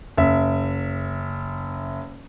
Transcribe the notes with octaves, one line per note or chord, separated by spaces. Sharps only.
F#1 E5